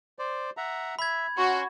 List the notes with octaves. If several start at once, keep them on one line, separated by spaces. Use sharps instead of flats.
C5 D5
E5 F#5 A#5
E5 B5 G#6
C#4 F#4 C6